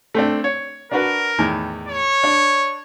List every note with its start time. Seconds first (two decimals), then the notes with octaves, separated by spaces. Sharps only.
0.14 A3 C4 D4
0.44 C#5
0.91 D4 F#4 A#4 B4
1.38 E2 A2 D#3
1.88 C#5
2.23 D4